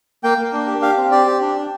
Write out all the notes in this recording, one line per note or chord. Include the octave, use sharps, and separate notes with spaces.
A#3 G5
A#3
D4
G4
G4 F5
C4
G4 D5
G4
D4
D4